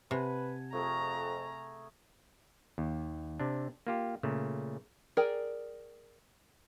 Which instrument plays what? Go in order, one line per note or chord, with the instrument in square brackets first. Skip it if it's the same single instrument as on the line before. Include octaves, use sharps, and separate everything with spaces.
[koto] C3 [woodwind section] B4 [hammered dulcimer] F#5 G#5 A5
[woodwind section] F2 [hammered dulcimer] A3 G#4 A#4 [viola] A#5
[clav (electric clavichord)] D#2
C3 D4
A#3 F4 G4
A#2 C#3 A3
[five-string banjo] G#4 A#4 D5 G5 G#5